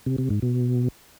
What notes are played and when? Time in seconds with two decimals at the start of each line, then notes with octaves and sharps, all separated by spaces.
0.06 C3
0.18 C3
0.30 G#2
0.42 B2